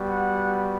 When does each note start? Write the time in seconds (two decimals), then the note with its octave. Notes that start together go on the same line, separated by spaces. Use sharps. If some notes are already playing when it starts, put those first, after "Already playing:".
Already playing: G3 B3 F#4
0.09 F#5